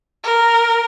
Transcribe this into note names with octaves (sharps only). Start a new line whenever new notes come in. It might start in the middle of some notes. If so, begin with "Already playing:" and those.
A#4